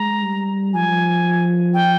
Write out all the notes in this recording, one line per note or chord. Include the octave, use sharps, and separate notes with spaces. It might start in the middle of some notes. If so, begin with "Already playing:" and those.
Already playing: G#3 A#5
G3
F3 G#5
G5